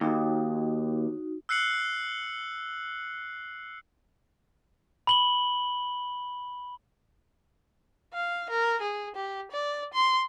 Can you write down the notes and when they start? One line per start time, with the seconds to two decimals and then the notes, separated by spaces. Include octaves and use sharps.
0.01 D#2 D#4 F#4
1.49 E6 F#6 C7 C#7 F#7
5.07 B5 F#7 G7
8.13 F5
8.50 A#4
8.82 G#4
9.15 G4
9.51 D5
9.94 C6